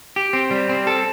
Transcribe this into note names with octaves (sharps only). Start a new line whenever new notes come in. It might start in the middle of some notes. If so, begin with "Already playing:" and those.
G4
C4
G3
C4
A4